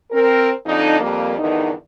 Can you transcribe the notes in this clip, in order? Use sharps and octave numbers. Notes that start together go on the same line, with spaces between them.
C4 A#4
F2 D3 D4 D#4
F2 G3 A#3
E2 G2 D3 D#3 D#4